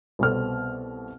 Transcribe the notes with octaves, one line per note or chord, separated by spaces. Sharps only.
C2 B2 C4 A4 F6